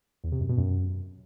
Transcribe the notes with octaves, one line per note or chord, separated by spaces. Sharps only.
E2
C3
F#2
B2
F#2